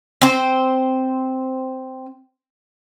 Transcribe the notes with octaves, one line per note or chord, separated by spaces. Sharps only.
C4 C5